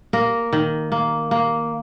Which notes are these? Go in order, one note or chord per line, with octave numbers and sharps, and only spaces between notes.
A#3 A#4
D#3
A#3
A#3